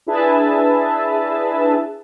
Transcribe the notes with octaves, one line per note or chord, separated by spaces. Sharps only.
D4 E4 G#4 B4 E5 A5